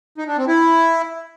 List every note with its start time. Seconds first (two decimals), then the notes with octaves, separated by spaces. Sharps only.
0.18 D#4
0.28 D4
0.38 C4
0.48 E4